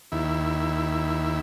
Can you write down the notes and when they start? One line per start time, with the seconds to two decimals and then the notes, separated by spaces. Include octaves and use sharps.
0.12 D#2 E4